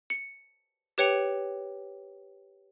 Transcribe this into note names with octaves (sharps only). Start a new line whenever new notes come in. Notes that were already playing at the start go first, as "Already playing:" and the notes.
C#7
G4 B4 C#5 G5 C#7 F7